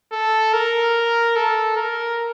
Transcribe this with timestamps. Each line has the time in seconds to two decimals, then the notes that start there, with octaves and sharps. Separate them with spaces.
0.12 A4
0.53 A#4
1.36 A4
1.77 A#4